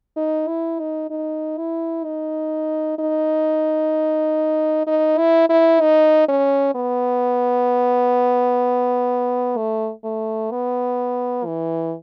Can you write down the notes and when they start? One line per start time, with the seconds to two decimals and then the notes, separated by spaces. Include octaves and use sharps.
0.16 D#4
0.48 E4
0.80 D#4
1.11 D#4
1.58 E4
2.05 D#4
2.99 D#4
4.87 D#4
5.18 E4
5.50 E4
5.81 D#4
6.28 C#4
6.75 B3
9.57 A3
10.04 A3
10.51 B3
11.46 E3